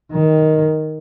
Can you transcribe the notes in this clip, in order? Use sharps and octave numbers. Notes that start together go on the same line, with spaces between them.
D#3